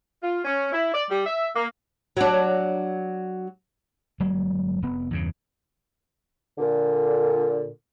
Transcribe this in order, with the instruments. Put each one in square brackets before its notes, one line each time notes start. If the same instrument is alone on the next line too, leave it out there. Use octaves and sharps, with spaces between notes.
[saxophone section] F4
C#4
E4
D5
G3
E5
A#3
[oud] F#3 D4
[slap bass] G1 F#3 G#3 A#3
F1 B3
E2 G2 C#3
[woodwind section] A#2 D3